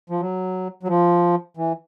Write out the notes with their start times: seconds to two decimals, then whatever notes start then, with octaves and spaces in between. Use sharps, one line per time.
0.10 F3
0.20 F#3
0.83 F#3
0.88 F3
1.57 E3